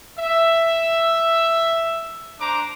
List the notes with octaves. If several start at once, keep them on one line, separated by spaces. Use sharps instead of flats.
E5
D4 C5 A#5 D6